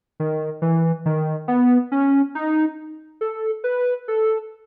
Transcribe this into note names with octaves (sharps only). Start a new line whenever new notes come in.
D#3
E3
D#3
B3
C#4
D#4
A4
B4
A4